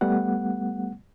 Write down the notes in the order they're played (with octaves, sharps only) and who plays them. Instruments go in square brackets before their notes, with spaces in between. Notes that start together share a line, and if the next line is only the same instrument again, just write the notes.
[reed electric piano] G3 A3 B3 F#5